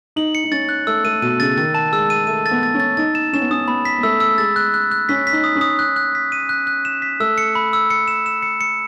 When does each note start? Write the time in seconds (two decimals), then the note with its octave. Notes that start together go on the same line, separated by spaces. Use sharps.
0.16 D#4 F#7
0.35 C#7
0.44 D#4
0.52 C#4 A6
0.69 F#6
0.87 A3 E6
1.04 A3 D#7
1.22 B2 D#7
1.40 C#3 A6
1.57 D#3 A6
1.74 A5
1.92 G#3 E6
2.10 D#7
2.27 A3 D#7
2.46 A6
2.51 B3
2.63 A6
2.74 C#4
2.80 A6
2.97 D#4 A6
3.15 E7
3.33 C#4 E7
3.41 B3
3.51 C#4 D#6
3.68 B3 B5
3.85 B6
3.98 B3
4.03 A3 E6
4.20 E6
4.38 G#3 A6
4.56 F#6
4.74 F#6
4.92 F#6
5.09 C#4 B6
5.27 B6
5.32 D#4
5.44 D#6
5.56 C#4
5.61 D#6
5.79 F#6
5.96 F#6
6.15 B6
6.32 D#7
6.49 F#6
6.67 F#6
6.85 E7
7.02 B6
7.20 A3 E6
7.38 C#7
7.55 B5
7.73 E6
7.90 C#7
8.08 E7
8.26 E7
8.42 C#7
8.61 C#7